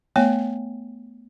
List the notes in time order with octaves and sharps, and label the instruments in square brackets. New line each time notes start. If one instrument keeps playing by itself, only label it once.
[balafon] A3 B3 C#5 G#5